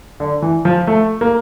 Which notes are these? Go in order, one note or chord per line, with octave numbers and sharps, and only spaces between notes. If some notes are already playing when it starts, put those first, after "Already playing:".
D3
E3
F3
A3
A#3